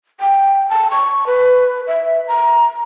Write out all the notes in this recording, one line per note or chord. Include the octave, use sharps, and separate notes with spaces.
G5
A5
C#6
B4
E5
A#5